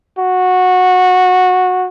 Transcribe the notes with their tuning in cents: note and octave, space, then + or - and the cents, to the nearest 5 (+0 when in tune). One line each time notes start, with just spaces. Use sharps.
F#4 -15